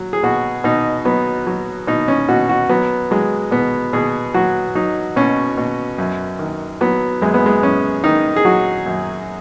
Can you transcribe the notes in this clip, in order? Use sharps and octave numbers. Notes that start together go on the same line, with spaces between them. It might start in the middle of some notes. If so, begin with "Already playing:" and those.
Already playing: F#3
G#4
B2 F#4
B2 D#4
F#3 B3
F#3
B2 D#4
C#4
B2 F#4
F#4
F#3 B3
F#3 G#3
B2 B3
B2 G#4
F#3 F#4
F#3 D#4
B2 C#4
B2
F#2
D#3
F#3 B3
F#2 G#3
B3
G#3
F#2 C#4
D#3 D#4
G#4
F#3 F#4
F#2